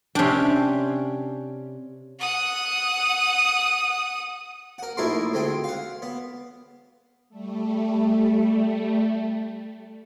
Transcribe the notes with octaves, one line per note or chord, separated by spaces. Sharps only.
C3 C#4 D4 G5
F#5 D#6
A#4 F#5
A#1 A3 D#4 E4 A#4 C6
D2 G#3 C4 G5
F5 F#5
B3
G3 A3